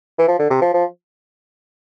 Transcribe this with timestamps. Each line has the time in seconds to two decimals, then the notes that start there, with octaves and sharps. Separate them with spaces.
0.19 E3
0.28 F3
0.39 D3
0.50 C3
0.61 F3
0.74 F3